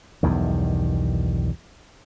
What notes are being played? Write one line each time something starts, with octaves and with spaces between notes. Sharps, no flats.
B1 E2 G2 D#3